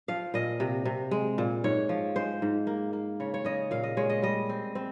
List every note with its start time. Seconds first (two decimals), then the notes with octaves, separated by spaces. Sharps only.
0.08 F3 F5
0.34 A#2 D#5
0.60 C3
0.85 C3
1.11 G#3
1.38 A#2
1.64 G#2 C#5
1.89 F3
2.16 G#3 C5
2.42 G#2
2.67 A#3
2.93 A#3
3.20 C#3 C#5
3.34 C#5
3.45 C#3 D#5
3.71 A#2 F5
3.83 D#5
3.97 G#3 C#5
4.09 D#5
4.22 G3 D#5
4.49 C4
4.75 C4